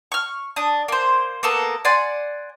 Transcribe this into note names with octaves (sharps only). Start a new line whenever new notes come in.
C#6 F6
D4 D#6
A#3 C5
A#3 B3 A4 A#4
D5 F#5 G#5 C6